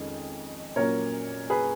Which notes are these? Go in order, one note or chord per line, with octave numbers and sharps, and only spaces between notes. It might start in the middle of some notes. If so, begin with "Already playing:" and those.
Already playing: F2 D#3 G#3 C#4
A#2 F#3 A#3 C#4 A#4 C#5
G#4 B4